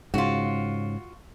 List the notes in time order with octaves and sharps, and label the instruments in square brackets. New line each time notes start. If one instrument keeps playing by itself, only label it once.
[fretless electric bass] G#2 C#3 [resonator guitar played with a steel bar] F4 F#4